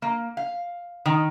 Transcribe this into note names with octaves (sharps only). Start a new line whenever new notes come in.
A#3
F5
D#3